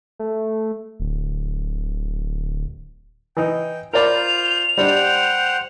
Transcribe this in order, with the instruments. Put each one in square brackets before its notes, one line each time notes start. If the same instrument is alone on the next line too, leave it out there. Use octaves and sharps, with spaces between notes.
[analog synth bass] A3
D1
[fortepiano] E3 D#4 [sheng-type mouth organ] G5
[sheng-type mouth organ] F4 C5 G6 [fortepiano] A#4 D5 B5 [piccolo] F7
[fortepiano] G3 D4 [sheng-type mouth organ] C5 F#5 G5